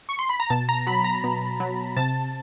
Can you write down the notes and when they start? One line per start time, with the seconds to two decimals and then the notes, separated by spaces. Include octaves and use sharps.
0.09 C#6
0.19 C6
0.29 B5
0.40 A#5
0.50 B2 A5
0.69 A#5
0.87 F#3 B5
1.04 A#5
1.24 B2
1.60 F#3
1.96 C3 A5